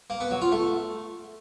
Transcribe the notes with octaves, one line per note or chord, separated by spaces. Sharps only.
A#3
B3
F#3
F4
A3